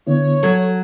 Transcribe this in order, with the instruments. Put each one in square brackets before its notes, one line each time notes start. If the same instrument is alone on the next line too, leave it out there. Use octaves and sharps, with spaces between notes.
[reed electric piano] D3 B3 E4 [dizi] C#5
[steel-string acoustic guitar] F#3 [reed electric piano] A4 G#6